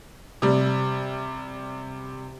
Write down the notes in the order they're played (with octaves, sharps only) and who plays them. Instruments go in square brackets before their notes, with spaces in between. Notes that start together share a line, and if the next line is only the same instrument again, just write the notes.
[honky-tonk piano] C3 G3